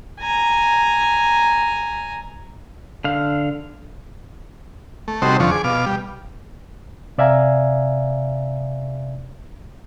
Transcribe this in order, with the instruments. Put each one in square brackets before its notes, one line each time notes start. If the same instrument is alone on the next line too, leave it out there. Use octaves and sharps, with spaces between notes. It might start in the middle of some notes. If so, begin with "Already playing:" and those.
[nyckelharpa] G#5 A#5
[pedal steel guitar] D3 F5
[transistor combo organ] A3
C3 G3 D#4 F#4 A4 C5
F2 D3 F3 C#6
G#4 D6
B2 F5 D6
G3
[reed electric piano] C3 D5 E5 F5 G#5 A#5